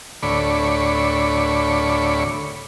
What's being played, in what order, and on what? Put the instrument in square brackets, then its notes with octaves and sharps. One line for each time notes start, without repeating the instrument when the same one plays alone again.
[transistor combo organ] D2 A2 C#5 D5 B5